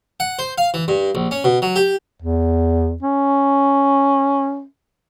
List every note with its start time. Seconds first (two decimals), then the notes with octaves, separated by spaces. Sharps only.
0.20 F#5
0.39 C5
0.58 F5
0.74 E3
0.88 G2
1.15 A#1
1.31 C#4
1.44 B2
1.62 F#3
1.76 G4
2.22 E2
3.03 C#4